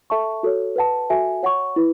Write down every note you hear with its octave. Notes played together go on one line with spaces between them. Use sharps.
A4 E5 A5 C#6
F#4 A4 C#5
B4 F#5 A5
F#4 A4 E5 G#5
C#5 F#5 C#6
E4 B4